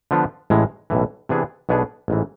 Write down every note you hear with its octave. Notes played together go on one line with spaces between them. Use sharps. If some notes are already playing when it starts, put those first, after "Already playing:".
D3 F3 B3 D4 F4
A1 A2 E3 G#3
B1 A2 E3
C3 E3 B3 D4 G#4
B1 B2 B3 D4 G#4
A1 G#2 E3